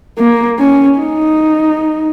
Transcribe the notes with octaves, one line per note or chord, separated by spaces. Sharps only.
A#3
C#4
D#4